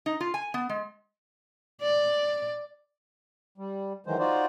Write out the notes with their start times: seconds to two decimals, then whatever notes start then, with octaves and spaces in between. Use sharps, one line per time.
0.06 D#4
0.20 F4
0.34 G#5
0.54 B3
0.69 G#3
1.82 D5
3.58 G3
4.07 D#3 E3 F#3 G#3 C5
4.19 D#4 F4 F#4 C5 D5